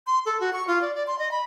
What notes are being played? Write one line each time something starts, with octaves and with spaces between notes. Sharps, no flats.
C6
A4
F#4
C#6
F4
D5
D5
C6
D#5
B5